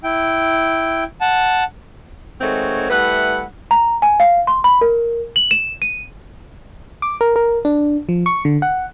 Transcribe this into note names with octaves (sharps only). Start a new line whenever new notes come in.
E4 G5
F#5 A5
D#3 G#3 A3 C4 F#4 C#5
G3 A3 E4 B4 F#5
A#5
G#5
F5
C6
B5
A#4
F#7
E7
D#7
D6
A#4
A#4
D4
F3
C#6
D3
F#5